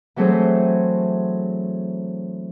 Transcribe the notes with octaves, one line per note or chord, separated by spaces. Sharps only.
E3 F#3 A3 C4 G#4 C5